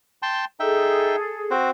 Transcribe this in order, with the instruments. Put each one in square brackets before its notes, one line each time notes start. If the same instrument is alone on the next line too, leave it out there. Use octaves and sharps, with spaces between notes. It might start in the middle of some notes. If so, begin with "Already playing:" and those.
[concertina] G5 A5 C6
[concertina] D#4 E5 G5 [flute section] G#4 A4
[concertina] C4 F#4 C5